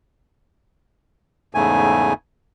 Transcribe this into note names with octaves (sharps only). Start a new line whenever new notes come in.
E2 G#2 C#3 A3 G#5